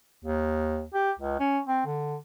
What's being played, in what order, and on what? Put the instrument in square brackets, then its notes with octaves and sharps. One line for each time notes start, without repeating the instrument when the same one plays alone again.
[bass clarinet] D#2
G4
C#2
C#4
C4
D3